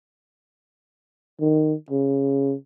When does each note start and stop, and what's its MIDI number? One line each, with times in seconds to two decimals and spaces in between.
1.41 1.73 51
1.90 2.54 49